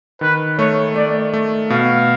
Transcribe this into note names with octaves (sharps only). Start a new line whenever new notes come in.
D#3 B4
A3 C#5
A3 D5
A3
B2 F5